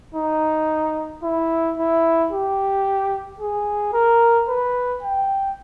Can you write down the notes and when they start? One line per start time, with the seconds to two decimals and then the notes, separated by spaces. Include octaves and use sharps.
0.14 D#4
1.23 E4
1.77 E4
2.31 G4
3.40 G#4
3.93 A#4
4.48 B4
5.03 G5